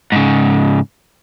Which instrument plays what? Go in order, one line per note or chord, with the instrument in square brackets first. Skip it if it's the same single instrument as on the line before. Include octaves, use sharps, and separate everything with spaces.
[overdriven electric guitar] G#2 C#3